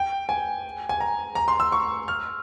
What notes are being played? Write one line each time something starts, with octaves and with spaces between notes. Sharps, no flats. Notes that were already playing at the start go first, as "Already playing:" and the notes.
Already playing: G5
G#5
G#5
A#5
A#5
C6
E6
C#6
F6